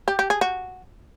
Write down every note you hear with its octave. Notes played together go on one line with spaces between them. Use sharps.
G4
G4
G#4
F#4